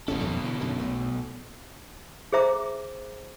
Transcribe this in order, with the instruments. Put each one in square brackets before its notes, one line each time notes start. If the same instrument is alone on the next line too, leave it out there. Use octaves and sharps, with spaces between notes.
[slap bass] D#1 A1 C#4 [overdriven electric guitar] B2 A4
[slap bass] F2 D#3
D3 E3
F#2 D3 D#3
B1 A3
[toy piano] G#4 C5 E5 A#5 D6